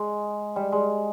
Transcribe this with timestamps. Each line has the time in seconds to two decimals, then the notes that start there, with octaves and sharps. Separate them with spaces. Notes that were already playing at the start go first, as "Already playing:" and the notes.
Already playing: G#3
0.56 G3
0.72 G#3